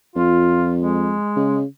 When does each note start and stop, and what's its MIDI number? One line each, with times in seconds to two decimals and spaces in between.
0.16 1.16 41
0.16 0.72 65
0.81 1.59 56
1.36 1.65 49